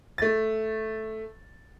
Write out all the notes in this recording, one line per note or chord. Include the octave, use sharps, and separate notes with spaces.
A3 A6